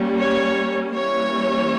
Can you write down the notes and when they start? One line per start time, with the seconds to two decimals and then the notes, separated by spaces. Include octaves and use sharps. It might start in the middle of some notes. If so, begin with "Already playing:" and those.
Already playing: G3 A#3 C#4
0.17 C#5
0.94 E3 G3 A#3 C#4 C#5